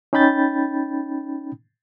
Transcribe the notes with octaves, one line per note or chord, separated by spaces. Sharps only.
C#4 D#4 G5 B5 G6 A6